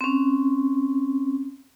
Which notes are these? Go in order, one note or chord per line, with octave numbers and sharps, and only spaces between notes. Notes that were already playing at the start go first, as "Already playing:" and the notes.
C4 C#4